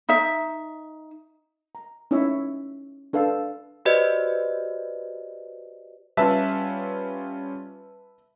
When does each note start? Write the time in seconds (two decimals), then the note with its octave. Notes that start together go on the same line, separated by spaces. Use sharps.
0.09 D#4 E5
1.75 A#5
2.11 C#4 D#4 E4 C#5 E5
3.13 D4 A4 B4 F5
3.85 F#4 G4 B4 C5 D5 D#5
6.17 G3 C#4 F4 B4 E5 A5